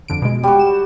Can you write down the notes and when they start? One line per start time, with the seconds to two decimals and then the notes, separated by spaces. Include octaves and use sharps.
0.08 F2 D3 D7
0.22 B2 G#3
0.43 G3 F#4
0.59 E7